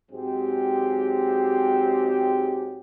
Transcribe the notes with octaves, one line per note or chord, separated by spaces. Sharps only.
G#2 F#3 G#3 C4 G4